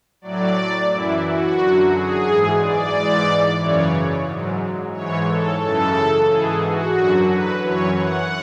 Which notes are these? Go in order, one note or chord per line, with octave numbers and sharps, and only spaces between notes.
A2 F#3 D5
F#2 E3 E4
F#4
F#2 D3 F#3
G#4
G#2 E3
D5
G#2 E3
F#2 C#3 E3 C#5
G#2 F#3
G#2 E3 C#5
A4
F#2 C#3 E3 A4
E3 G#4
G#2
F#4
F#2 D3 F#3
B4
F#2 E3 C#5
F#5